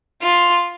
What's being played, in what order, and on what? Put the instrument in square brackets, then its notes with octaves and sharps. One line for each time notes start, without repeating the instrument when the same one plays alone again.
[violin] F4